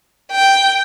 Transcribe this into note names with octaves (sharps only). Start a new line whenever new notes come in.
G5